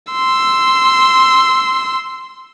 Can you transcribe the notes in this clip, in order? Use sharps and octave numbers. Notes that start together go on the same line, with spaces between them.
C6 E6